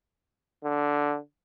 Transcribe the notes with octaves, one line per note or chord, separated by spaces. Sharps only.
D3